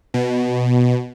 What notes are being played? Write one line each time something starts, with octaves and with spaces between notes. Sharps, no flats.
B2